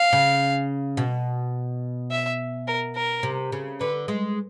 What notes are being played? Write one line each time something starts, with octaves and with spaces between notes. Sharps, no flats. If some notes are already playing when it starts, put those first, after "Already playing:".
Already playing: F5
C#3
B2
E5
A#4
A#4
C3
C#3
D3 B4
G#3